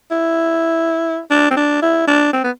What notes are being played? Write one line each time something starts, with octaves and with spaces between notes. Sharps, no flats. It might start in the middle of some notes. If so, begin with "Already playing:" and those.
E4
D4
C4
D4
E4
D4
C4
B3